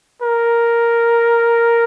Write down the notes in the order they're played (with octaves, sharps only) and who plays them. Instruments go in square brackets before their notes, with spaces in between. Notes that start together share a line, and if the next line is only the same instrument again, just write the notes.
[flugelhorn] A#4